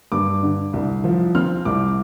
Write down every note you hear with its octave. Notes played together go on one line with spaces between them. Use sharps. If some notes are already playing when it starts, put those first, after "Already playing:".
G2 D6
D3
C2
F3
C4 F6
C2 D6